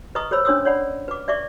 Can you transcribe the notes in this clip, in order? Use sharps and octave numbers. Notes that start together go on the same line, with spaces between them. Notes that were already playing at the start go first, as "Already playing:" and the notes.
B4 D#5 A#5 C#6 D#6
A4 C5 C#5 B5 E6
C#4 D4 C#5 C6 D#6 E6
C#5 D5 F#5 B5
B4 D6
D5 E5 C#6 D6